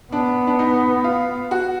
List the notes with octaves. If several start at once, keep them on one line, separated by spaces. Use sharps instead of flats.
B3 D4
D4
D#4
F4
F#4